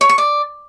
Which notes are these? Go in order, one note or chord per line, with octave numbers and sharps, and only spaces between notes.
C#5
C#6
D5